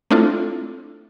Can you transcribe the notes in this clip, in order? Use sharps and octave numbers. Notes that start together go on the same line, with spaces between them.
A3 C4 D4 E4 F4 A4